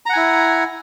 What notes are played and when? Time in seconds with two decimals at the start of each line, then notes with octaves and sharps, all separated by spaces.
0.06 A#5
0.09 F#5
0.13 G#5
0.16 E4